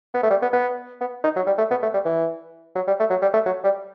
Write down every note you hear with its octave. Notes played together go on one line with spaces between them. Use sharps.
B3
A3
G3
B3
B3
B3
D#4
F#3
G3
A3
B3
A3
G3
E3
F#3
G3
A3
F#3
G3
A3
F#3
G3